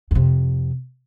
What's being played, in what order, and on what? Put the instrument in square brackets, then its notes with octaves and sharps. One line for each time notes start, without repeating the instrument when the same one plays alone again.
[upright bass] F2 C3